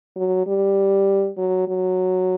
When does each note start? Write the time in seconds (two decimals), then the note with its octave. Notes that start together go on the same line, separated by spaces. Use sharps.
0.16 F#3
0.47 G3
1.37 F#3
1.68 F#3